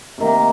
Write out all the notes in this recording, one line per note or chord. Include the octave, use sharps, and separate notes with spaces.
C3 D#3 A#3